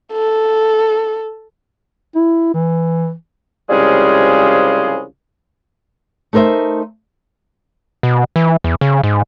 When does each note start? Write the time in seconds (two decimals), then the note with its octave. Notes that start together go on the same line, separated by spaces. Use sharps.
0.13 A4
2.16 E4
2.54 E3
3.70 C2 C#3 F3 G3 G#3 G#4
6.33 A3 D#4 A#4 C5 E5
8.03 B2
8.36 E3
8.64 E2
8.81 C#3
9.04 G#2